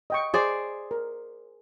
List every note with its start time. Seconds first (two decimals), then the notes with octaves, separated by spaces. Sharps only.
0.10 D#5 G5 C#6
0.34 G#4 C5 D5
0.91 A#4